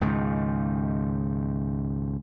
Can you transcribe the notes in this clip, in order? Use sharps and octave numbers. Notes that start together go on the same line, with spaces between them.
C#2 G#2 D#3